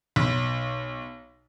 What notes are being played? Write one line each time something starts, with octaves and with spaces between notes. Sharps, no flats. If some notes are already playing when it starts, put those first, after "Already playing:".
B1